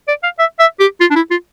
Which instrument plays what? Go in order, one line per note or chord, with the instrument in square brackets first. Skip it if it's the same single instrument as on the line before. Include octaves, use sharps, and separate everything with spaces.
[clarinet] D5
F5
E5
E5
G4
F4
D4
E4
F4